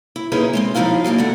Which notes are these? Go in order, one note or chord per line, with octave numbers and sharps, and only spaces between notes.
E4
A#3 C#4 D#4 E4 G#4 B4
G#3 A#3 C4
D#2 F3 A3 D#4 E4 F5
F#3 G3 A#3 D#4
A#2 D3 A3 F#5